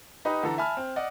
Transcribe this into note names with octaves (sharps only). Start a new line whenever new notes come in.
D#4 G4 B4 D#5 B5
D3 E3 A4 A#5
E5 G#5 A5 B5 F6
C4
D5 D#5 F#5